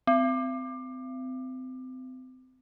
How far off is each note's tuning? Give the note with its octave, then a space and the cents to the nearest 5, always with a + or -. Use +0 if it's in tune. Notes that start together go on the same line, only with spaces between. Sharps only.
C4 -30